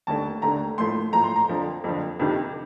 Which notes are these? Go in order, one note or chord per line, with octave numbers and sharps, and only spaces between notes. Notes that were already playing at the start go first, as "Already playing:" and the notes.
D#2 D3 A3 A5
D#2 D3 A3 A#5
A2 F3 A3 C6
A2 F3 A3 A#5
C6
A#5
F2 D3 F3
F2 D3 F3
F2 C3 D#3